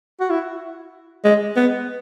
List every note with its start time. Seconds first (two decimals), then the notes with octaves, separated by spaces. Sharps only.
0.20 F#4
0.30 E4
1.25 G#3
1.57 B3